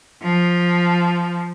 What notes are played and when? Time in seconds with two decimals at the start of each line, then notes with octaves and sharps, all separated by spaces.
0.22 F3